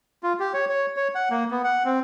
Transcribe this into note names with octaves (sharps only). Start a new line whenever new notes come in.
F4
G4
C#5
C#5
C#5
F#5
A#3
B3
F#5
C4